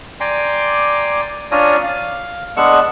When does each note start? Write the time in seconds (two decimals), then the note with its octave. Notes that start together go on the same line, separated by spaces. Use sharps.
0.20 D5 G5 G#5 A#5 C6 D6
1.52 C#4 D4 F4 C#5 A#5 D#6
1.83 F5
2.57 G#3 B3 D4 F#5 C#6 E6